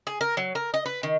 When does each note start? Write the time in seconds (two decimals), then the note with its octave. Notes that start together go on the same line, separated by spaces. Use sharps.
0.07 G#4
0.21 A#4
0.37 F#3
0.55 A#4
0.74 D#5
0.86 B4
1.03 D#3